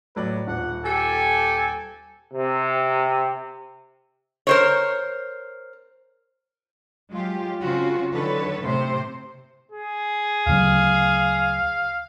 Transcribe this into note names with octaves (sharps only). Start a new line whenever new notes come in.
A2 F#3 B4 D5
D#1 F#5
G4 A4 G#5
C3
A#4 C5 C#5
F#3 G#3 F4 G4
C#3 C4 C#4 F4 F#4
D3 D#3 F#3 A4 B4 C#5
A2 C3 C5
G#4
D2 C#3 F#3 F5